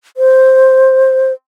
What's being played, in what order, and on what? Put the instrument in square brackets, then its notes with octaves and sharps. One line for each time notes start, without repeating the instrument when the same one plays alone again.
[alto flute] C5